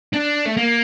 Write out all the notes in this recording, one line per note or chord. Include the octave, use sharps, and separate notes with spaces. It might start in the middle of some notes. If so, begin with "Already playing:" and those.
D4
A3
A#3